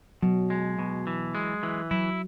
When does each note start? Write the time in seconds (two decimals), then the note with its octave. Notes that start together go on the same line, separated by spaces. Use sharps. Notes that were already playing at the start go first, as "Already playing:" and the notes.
0.22 B2 F#3
0.50 G#3
0.79 B2
1.07 E3
1.35 G#3
1.63 E3
1.91 F#3 E4